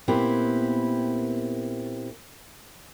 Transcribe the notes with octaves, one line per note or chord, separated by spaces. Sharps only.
A#2 B3 C4 E4 G4